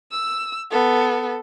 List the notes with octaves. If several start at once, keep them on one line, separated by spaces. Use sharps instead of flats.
E6
B3 A4